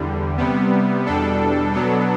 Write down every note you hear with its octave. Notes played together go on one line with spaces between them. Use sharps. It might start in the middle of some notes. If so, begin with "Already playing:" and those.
Already playing: E2 D3 G3
C3 G3 B3
E2 B2 G3 D4 A4
B2 F#3 B3 D4 A4